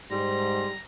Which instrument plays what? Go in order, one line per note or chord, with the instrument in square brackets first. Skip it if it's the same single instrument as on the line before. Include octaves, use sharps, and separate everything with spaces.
[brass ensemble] G#2 [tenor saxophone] G3 [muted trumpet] A#5 [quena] C6